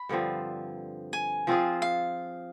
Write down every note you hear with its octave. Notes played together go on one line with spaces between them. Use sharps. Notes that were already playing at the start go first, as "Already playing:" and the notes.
Already playing: B5
G2 D3 F3 C4
G#5
F3 C4 F4 G#4
F5